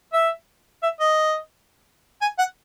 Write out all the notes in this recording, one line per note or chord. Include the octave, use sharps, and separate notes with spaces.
E5
E5
D#5
G#5
F#5